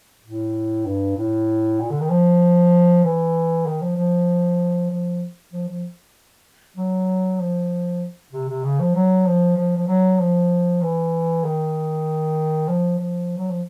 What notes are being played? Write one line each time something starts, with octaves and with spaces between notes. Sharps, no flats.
A2
G2
A2
A#2
D3
D#3
F3
E3
D#3
F3
F3
F3
F3
F3
F#3
F3
C3
C3
C#3
F3
F#3
F3
F3
F3
F#3
F3
E3
D#3
F3
F3
F#3
F3